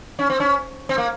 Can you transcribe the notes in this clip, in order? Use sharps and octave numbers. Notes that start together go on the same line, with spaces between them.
C#4
C4
C#4
C4
A#3